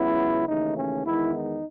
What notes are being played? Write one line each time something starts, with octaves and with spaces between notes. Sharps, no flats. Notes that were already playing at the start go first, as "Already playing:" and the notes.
Already playing: C#2 C#3 F#3 B3 E4
D#2 C#3 E3 A3 D#4
C#4
E2 D#3 G#3 B3 E4
D#4